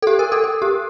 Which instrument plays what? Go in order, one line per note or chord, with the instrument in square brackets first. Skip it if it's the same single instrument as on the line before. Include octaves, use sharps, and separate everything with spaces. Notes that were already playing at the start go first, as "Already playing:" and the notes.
[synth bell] A4
G4
A#4
A4
A4
G4